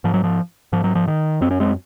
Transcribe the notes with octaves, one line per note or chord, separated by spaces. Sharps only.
G#2 F3
F#3
F3
G#2 F3
F#3
F3
D#3
F#2 C4
C#4
G#3 C4